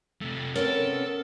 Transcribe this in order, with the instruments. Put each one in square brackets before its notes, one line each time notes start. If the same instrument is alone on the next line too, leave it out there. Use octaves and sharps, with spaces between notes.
[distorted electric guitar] C3 A3
[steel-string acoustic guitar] C3 B3 C#4 [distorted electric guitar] A4 [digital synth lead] A#4